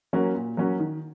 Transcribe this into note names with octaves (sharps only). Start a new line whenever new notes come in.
F#3 A#3 C#4 F#4
A#2
F#3 A#3 C#4 F#4
D#3